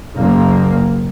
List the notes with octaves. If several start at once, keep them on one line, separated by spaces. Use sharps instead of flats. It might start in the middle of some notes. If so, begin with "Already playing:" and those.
F#1 A#3